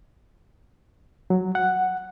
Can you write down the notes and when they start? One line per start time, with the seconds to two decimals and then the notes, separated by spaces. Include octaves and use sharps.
1.30 F#3
1.55 F#5